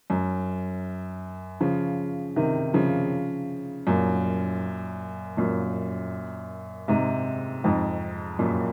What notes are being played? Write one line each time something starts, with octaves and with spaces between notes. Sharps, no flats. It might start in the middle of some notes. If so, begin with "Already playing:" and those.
F#2
C#3 F3
C3 D#3
C#3 F3
F#2 A#2
F#2 A#2
G#2 C3
F2 G#2
F#2 A#2